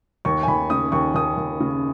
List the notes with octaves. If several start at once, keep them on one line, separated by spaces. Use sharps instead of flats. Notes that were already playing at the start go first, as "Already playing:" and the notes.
D#2 C#6
G#5
D#2 B5
C#3 D#6
D#2 C#6
D#2 D#6
D#2
C#3